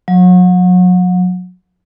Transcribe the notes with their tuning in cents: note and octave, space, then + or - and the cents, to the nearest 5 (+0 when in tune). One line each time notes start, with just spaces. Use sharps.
F#3 -35